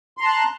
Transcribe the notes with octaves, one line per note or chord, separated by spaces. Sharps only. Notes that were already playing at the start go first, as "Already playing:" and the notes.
A5 A#5 C6 F#6